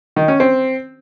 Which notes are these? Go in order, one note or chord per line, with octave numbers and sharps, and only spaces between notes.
D#3
C#4
C4